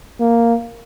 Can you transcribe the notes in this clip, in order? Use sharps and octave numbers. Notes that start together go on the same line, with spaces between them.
A#3